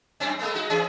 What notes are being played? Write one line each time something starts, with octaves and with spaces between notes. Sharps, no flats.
F#2 C4 C#4
G#3 A3 B3
G#3 D#4 F#4
E3 C#4 G#4